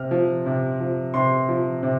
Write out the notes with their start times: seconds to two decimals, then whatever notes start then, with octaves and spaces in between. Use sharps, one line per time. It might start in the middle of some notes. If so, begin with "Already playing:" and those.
Already playing: C3 F6
0.11 F3
0.46 C3
0.80 F3
1.14 C3 C6
1.49 F3
1.83 C3